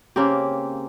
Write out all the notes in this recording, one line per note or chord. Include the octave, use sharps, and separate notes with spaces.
C#3 A#3 C4 G4